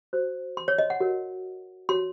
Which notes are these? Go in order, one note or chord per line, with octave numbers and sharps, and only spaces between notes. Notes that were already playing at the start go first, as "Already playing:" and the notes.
F#4 C5
C6
C#5
D#5
F#5
F#4 A#4 C#5
F#4 C#5 C6